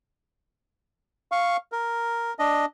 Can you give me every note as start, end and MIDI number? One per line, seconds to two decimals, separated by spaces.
1.32 1.57 77
1.32 1.57 85
1.72 2.34 70
2.39 2.65 62
2.39 2.65 75